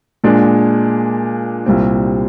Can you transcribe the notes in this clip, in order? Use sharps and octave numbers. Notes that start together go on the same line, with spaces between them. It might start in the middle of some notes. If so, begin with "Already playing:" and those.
A#2 G#3 D4
C2 A#2 G3 C4